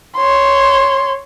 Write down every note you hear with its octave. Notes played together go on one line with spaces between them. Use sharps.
C#5 C6